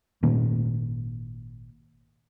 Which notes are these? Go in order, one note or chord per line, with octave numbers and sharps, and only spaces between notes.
G#1 A#2 D#3 A#3